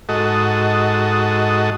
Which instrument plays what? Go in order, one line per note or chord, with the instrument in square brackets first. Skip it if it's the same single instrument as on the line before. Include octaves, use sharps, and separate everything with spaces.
[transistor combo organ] G#2 F#4 A4 D#5